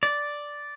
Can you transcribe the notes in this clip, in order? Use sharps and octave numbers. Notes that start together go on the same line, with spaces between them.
D5